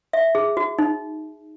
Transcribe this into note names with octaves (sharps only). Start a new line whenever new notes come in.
E5
G#4
F#4
D#4